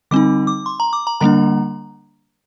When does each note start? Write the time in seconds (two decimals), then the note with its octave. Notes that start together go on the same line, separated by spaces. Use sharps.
0.11 D3 G3 C4 D#4 D6
0.47 D6
0.66 C6
0.80 A#5
0.93 D6
1.07 A#5
1.20 D3 G3 A#3 D4 A#5